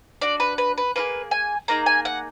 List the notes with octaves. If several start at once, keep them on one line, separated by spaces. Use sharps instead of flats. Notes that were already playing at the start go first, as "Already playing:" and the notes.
D4 F#4 D5
B4
B4
B4
A#3 D#4 G#4 B4
G#5
A#3 D#4 G#4 A#5
G#5
F#5